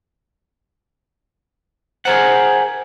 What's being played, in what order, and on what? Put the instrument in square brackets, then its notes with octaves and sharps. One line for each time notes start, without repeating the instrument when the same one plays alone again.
[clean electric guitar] G#4 A#4 F#5 [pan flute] C5